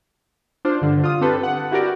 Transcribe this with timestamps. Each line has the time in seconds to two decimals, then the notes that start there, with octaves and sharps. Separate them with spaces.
0.65 D4 F4 C5
0.81 G2 D3
1.03 F4 D#6
1.21 C4 D4 G4 A4 B4
1.43 F#5
1.71 E4 F#4 G4 A#4 D5